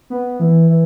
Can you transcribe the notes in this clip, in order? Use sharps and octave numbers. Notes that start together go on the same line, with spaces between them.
B3
E3
E3